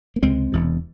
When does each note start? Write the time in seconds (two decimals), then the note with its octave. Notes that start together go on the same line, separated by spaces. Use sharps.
0.16 A#3
0.22 C#2 C3 G#3 C4
0.52 E1 E2 C3